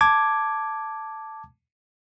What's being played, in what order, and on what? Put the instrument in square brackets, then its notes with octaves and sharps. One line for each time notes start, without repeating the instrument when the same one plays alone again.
[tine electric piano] A5 D6 G#6